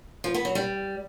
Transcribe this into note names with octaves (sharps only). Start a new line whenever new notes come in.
F3
B3
F#3
G3